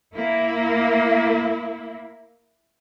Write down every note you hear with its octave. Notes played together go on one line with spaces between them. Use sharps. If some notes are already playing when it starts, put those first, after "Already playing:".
A#3 E4